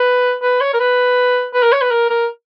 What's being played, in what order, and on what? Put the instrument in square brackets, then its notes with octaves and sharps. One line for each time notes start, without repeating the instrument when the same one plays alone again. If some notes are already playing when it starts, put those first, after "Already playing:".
Already playing: [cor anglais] B4
B4
C#5
A#4
B4
B4
A#4
C#5
B4
A#4
A#4